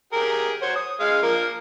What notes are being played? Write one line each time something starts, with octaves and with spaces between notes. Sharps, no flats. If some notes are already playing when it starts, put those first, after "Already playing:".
G4 G#4 A#4
F#4 C5 C#5
D#6
G#3 F5
F3 A#3 A#4